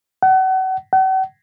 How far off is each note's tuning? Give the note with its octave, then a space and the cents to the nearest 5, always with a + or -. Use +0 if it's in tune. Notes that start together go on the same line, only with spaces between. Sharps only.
F#5 +35
F#5 +45